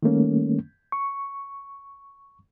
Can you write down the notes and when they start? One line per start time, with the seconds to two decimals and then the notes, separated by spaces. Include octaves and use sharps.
0.03 D#3 G3 A3 A#3 C#4
0.92 C#6